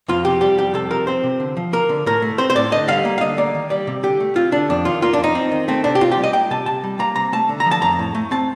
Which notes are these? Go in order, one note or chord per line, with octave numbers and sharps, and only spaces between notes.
F2 F4
C3 G4
G3 G4
F2 G4
C3 A4
F3 A#4
C4 C5
C3
D3
F3
A#3 A#4
D3
A2 A#4
A3
C4 C5
C5
A2 D5
D3 D#5
G3 F5
A#3
F5
D3 D#5
A#3 D5
D#3
G3 D5
C3
D3 G4
A3
C4 F4
D3 D4
F2 D4
D#3 F4
A#3 F4
D4
F2 D#4
C4
D#3
A3 C4
C3 D4
G4
C3 F4
G4
G3
D#5
A#3 G5
C3 A5
C3 A5
G3
A#3 A#5
C3 A#5
A3 A5
D3
A#5
F3
A5
F2 A#5
A2
A3
C4 A5